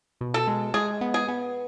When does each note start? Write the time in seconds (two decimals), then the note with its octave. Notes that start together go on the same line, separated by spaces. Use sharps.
0.21 B2
0.34 A4
0.47 G#3
0.74 G#3 G#4
1.01 B3
1.14 G#4
1.28 B3